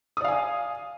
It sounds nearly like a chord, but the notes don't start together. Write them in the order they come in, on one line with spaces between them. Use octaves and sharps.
D#6 D5 F5 G#5